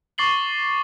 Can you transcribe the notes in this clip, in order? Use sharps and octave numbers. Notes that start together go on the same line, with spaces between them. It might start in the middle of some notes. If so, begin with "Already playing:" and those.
C#6 D6 A6 C7 F#7 G7